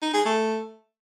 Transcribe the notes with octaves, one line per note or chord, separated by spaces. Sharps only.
D#4
G#4
A3